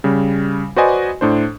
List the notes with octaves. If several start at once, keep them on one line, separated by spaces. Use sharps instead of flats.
C#3 G3
F#4 B4 C5 D5 D#5 G#5
A2 D4 C5